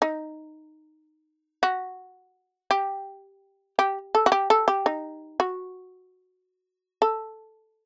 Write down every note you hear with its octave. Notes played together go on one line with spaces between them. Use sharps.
D#4
F#4
G4
G4
A4
F#4
G4
A4
G4
D#4
F#4
A4